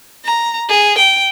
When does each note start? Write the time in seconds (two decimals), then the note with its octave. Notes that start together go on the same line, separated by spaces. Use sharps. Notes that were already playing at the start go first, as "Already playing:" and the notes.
0.25 A#5
0.69 G#4
0.98 G5